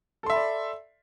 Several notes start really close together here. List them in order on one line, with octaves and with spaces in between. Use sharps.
A4 C6 E5 B5 D5